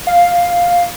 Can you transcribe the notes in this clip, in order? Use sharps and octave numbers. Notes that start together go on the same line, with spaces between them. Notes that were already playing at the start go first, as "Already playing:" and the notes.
F5